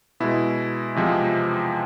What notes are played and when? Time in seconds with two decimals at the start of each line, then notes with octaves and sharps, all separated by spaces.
0.20 B2 G#3 E4
0.95 E2 C3 F3 G#3